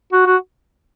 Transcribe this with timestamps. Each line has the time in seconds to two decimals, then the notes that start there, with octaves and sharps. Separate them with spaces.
0.13 F#4
0.26 F#4